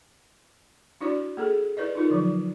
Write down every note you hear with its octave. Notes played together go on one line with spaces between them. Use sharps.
D4 E4 F#4 D5
A#3 G#4 A4
E4 B4 D5 D#5
D#4 F4 A#4
D3 F3 F#3